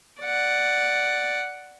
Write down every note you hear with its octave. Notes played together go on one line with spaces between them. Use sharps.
D5 F#5